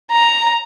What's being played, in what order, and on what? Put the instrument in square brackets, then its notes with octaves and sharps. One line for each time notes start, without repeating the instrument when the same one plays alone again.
[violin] A#5